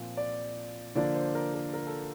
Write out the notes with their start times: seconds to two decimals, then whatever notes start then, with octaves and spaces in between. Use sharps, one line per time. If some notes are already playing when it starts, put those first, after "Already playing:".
Already playing: A#2 F3 C4
0.17 D5
0.95 D3 F3 A#3 D4 D5
1.15 C5
1.35 A#4
1.54 A#4
1.74 A#4
1.87 A4